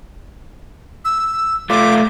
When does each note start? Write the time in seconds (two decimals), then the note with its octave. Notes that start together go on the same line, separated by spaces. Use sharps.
1.05 E6
1.70 A3 F4 D6